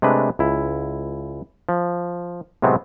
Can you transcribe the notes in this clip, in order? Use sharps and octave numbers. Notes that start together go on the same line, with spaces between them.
C3 G#3 A3 D4 B4
C#2 E4
F3
A2 C3 F#3 G#3 B3 C4